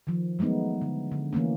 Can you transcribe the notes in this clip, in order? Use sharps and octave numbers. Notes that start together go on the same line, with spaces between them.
D#3 F3
F#3 G#3 A3 B3 D#4
D3
D3
E3 A3 A#3 C#4